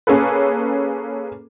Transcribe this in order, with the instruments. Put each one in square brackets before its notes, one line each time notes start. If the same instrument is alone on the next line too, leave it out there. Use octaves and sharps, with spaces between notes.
[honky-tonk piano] A#3 C#4 G#4 A4 B4